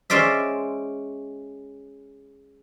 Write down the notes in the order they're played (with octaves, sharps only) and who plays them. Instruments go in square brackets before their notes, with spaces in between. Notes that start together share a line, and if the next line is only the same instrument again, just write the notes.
[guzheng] G#3 C#4 C5 D5 E5